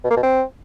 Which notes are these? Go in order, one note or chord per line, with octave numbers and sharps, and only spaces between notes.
B2
A#3
B2
C4